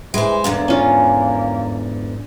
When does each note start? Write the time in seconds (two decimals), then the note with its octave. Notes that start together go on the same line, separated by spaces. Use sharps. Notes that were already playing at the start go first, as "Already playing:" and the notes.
0.14 E3 G#3 C5
0.44 E2 G#2 D3 A#3
0.68 C#4 F4